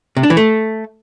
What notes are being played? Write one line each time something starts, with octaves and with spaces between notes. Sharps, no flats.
C3
D4
E3
A3